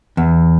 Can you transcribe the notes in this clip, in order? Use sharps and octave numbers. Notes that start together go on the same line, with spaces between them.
E2